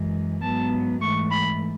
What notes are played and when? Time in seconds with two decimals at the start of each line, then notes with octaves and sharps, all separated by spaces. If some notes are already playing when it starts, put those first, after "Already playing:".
Already playing: F#2 E3 G#3
0.42 G#2 F#3 B3 A5
1.01 G#2 E3 A3 C#6
1.30 B5